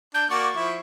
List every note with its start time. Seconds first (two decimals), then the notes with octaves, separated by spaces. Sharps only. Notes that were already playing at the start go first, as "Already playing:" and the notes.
0.14 D4 G6
0.30 A#3 F#4 D5 C#6
0.56 F3 E4